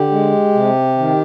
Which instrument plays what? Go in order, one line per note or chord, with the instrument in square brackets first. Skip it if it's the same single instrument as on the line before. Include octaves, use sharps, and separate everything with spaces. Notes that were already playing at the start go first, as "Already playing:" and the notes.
Already playing: [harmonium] D3 G4
G#3
C3
D#3